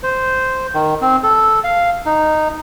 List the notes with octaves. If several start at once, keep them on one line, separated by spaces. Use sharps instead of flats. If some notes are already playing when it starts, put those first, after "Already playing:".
C5
D#3
C4
A4
F5
D#4